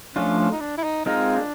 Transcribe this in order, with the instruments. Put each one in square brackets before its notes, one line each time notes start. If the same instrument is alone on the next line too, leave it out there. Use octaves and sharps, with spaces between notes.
[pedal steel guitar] F3 A3 D4 F4 [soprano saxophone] C#4
[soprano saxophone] C#4
D#4
D4
E4
D#4
[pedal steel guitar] G#3 C4 F4 A#4 [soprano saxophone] D#4
[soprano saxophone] D4